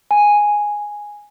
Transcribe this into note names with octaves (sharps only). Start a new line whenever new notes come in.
G#5